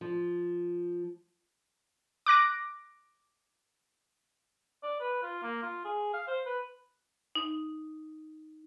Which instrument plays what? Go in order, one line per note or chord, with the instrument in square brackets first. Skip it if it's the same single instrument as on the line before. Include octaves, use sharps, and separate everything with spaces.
[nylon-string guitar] F3
[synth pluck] D6 F#6 A#6 D7
[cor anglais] D5
B4
F4
A#3
F4
G#4
F5
C5
B4
[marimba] D#4